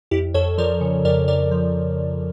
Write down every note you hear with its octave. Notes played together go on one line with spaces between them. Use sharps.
F2 E4 G4
F2 A4 C#5
F3 A#4 D5
C#3
F2 A#4 D5
F2 A#4 D5
F3